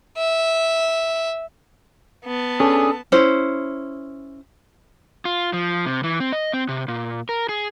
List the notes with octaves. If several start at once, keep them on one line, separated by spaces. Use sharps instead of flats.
E5
B3 A5
C#4 D4 G#4 A4
C#4 E4 C5
F4
F3
C3
E3
C4
D#5
C4
C3
A#2
A#4
G#4